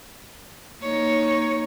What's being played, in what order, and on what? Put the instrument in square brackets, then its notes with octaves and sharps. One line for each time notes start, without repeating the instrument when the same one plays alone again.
[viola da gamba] A#3 D#4 C#5